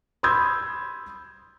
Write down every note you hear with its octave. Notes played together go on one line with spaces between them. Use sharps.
B5 C6 D#6 E6 G6 G#6